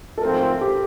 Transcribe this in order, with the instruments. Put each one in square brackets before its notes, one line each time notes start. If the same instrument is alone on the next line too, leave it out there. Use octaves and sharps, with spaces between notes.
[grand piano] A4
[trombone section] G#2 F3 A3 C4 F4 [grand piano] A#4
[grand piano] A4
G4